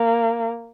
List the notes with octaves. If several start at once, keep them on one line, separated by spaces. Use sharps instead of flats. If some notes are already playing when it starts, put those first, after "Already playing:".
Already playing: A#3